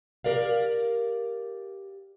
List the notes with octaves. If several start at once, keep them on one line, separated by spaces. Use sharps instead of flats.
G4 A#4 D5 F5